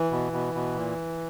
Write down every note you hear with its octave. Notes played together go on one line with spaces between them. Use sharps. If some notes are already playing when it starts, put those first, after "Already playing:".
Already playing: E3
B2
B2
B2
A#2